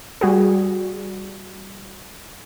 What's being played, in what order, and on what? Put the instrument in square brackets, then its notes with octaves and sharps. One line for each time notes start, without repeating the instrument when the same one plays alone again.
[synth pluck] G3 F#4 G#4